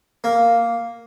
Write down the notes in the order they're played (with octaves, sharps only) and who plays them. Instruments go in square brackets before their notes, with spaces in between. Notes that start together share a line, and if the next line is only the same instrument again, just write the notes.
[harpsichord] A#3